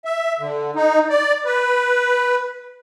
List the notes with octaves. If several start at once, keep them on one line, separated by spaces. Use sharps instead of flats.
E5
D3
D#4
D5
B4